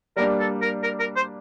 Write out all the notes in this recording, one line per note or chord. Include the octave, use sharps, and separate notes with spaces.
G3 A#3 D4 A#4
A4
A#4
A#4
A#4
C5